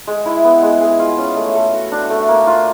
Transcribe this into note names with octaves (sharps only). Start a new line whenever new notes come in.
G#3
E4
B3
G#3
G#4
F4
C#4
A3
A4
F#4
D4
A3
A#3
F4